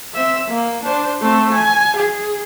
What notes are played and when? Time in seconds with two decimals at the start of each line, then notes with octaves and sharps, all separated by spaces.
0.14 C4 E5
0.48 A#3
0.84 D4 C5
1.21 A3 C4
1.53 G#5
1.96 G#4